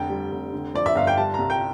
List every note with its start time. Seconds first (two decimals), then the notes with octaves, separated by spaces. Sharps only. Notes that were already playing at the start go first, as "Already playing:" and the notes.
Already playing: F1 D3 G5
0.09 G3
0.32 F1
0.53 D3
0.74 F3 D5
0.86 E5
0.95 G1 F5
1.07 G5
1.17 G3 A5
1.34 C2 A#5
1.50 G5